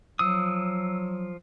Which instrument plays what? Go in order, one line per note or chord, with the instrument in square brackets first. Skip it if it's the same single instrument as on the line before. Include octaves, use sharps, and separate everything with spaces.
[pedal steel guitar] F3 D#6 [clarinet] F#3 [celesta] E6